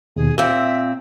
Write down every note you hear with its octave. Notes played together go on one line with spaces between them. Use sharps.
D#2 B2 G#4
A#2 C4 E5 E6